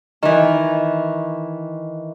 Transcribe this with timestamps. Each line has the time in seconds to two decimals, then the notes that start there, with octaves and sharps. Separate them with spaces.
0.22 D#3 E3